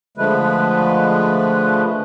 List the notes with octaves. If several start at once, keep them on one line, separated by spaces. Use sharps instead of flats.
D3 F3 G#3 A3 B4